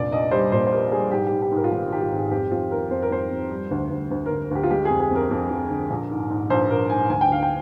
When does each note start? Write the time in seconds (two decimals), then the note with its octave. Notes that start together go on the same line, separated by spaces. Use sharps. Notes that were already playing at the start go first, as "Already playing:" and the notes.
Already playing: F1 A#1 D5
0.12 A#1 D#5
0.31 G3 C5
0.52 A#2 C5
0.67 C5
0.72 G3 A#4
0.92 G3 G#4
1.11 G#2 G4
1.26 G#2 G4
1.42 G4
1.51 G#2 A#4
1.64 F4
1.71 G#1 G4
1.91 D#3 G4
2.02 F4
2.12 G#1 G#4
2.31 F2 G4
2.51 F2 F4
2.71 D#3 A#4
2.90 F2 C5
3.02 A#4
3.11 F2 C5
3.31 F2
3.51 G3
3.71 D2
3.91 D2
4.11 D2
4.26 D2 A#4
4.51 D2 G4
4.63 F4
4.70 G#3 G4
4.85 F2 G#4
5.00 G#4
5.11 F2 A#4
5.31 F2
5.51 F2
5.70 D3
5.90 A#1
6.11 G#2
6.30 G#2
6.50 A#1 C5
6.70 A#1 A#4
6.90 G#2 G#5
7.09 D2 G#5
7.21 G5
7.30 D2 F5
7.43 G5